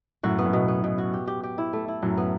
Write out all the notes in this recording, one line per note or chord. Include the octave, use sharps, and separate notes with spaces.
F#2 A2 F#4
B3
F#2 A2
B2
B3
B2
F#4
G4
G4
G4
E4
A3
E4
F#2 A2 F#3
B3